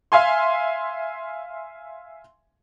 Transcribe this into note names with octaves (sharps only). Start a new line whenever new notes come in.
E5 F5 G#5 C6